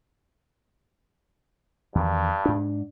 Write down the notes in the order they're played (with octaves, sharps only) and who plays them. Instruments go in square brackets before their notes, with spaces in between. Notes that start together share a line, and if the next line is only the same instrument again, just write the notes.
[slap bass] E2 D#3 [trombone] G2
[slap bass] G#2 D4